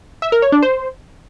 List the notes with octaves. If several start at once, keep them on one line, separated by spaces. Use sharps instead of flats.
E5
A#4
C#5
D4
C5